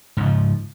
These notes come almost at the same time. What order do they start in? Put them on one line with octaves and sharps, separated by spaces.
G#2 C#3 F3